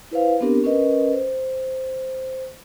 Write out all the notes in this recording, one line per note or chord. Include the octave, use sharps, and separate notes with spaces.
E4 B4 C5 F5
B3 C4 D4 G4 A#4
C#4 A#4 B4 D#5
C5